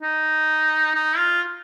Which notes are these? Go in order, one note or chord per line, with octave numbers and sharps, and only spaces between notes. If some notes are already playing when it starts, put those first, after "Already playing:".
D#4
D#4
F4